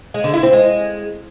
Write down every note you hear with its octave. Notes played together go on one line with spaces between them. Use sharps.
G#3
D3
E4
C4
G#3